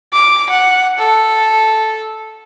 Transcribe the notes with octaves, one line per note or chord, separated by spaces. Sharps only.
D6
F#5
A4